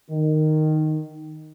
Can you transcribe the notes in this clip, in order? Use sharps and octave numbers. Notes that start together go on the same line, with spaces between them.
D#3